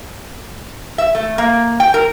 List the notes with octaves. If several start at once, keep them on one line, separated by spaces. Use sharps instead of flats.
E5
A3
A#3
G5
A#4